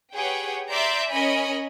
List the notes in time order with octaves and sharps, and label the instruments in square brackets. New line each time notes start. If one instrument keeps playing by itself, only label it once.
[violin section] G4 G#4 B4 C#5 F#5 G5
D5 E5 A#5 C6 D6 G6
C#4 A#4 C#5 D#5 G#5 B5